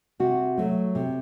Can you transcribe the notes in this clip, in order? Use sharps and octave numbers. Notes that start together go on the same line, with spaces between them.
C3 F#4
F#3 A3
C3